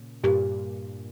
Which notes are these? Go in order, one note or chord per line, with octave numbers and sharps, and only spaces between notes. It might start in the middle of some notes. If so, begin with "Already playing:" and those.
Already playing: A#2 C#3
G2 A#2 G4